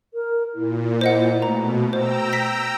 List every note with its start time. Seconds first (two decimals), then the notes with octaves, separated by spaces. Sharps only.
0.14 A#4
0.54 A#2 E4
1.01 E4 C5 D#5 F#5
1.42 B2 A3 A#5
1.93 C5 G5 A#5 E6
2.33 A#6 B6